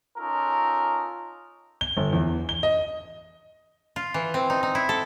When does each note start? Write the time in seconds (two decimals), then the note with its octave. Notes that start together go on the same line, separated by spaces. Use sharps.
0.18 C#4 D#4 F4 A4 A#4
1.81 G7
1.97 G1
2.13 E2
2.49 G7
2.63 D#5
3.96 F4
4.14 E3
4.34 C4
4.50 D#4
4.63 D#4
4.75 E4
4.89 A4